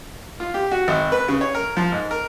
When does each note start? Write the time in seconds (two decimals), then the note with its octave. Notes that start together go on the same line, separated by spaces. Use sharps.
0.40 F4
0.54 G4
0.71 F#4
0.88 G#1
1.12 B4
1.28 C#3
1.41 C#5
1.55 A#4
1.77 F3
1.92 G#2
2.11 A#4